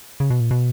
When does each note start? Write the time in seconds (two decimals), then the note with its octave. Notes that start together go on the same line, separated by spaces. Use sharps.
0.20 C#3
0.30 B2
0.40 A#2
0.51 B2